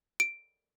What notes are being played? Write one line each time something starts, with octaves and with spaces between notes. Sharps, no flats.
D7